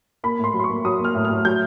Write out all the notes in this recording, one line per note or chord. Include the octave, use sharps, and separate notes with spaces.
A#3 B5
A2 C6
F#3
C6
C#6
A#3
F#3 D#6
A#3
F6
A2
A2 F6
F#3 G6